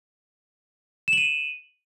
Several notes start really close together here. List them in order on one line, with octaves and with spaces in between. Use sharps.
E7 F#7 D#7